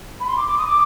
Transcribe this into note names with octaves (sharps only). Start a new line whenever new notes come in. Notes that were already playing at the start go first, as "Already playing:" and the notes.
B5
C6
D6
D6
D#6
D6